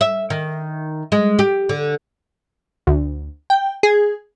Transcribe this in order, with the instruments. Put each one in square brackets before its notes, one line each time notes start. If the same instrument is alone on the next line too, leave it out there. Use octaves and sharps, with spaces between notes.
[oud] E5
D#3
G#3
G4
D3
[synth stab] D2
G5
G#4